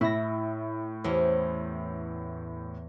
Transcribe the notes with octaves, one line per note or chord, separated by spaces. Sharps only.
A2 E4 E5 A#6
E2 C#4 G4 C5